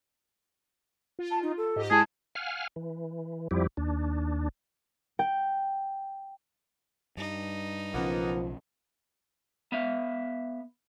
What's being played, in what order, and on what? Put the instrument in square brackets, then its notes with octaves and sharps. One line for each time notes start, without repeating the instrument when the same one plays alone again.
[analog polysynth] F4
[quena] A5
D#4
A4
[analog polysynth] G#2 G4 D#5
[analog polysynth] G#3 E4 [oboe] G#4 [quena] A5
[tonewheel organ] F5 F#5 G#5 F6
E3
F2 F3 G3 E4 G4
D#2 D4
[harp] G5
[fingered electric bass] G2 [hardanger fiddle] D#4
[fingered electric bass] B1 C#3 C#4 [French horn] F3 [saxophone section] A#3 B3
[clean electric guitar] B3 E5 F5